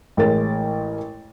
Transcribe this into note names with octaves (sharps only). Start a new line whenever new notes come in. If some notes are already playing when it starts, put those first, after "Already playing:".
A1 G#3 A#4 C#5 A6